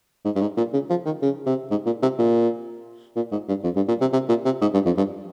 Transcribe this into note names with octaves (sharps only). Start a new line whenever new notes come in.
G#2
G2
G#2
A#2
C#3
F3
D#3
C#3
C3
G#2
A#2
C3
A#2
A#2
G#2
G2
F2
G2
A#2
C3
C3
A#2
C3
G#2
G2
F2
G2